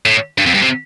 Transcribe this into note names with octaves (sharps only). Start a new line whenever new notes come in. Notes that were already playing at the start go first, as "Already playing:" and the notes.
A2
G2
F2
G2
C3